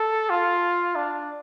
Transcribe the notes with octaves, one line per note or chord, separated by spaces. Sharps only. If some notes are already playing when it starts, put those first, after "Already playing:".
Already playing: A4
F4
D4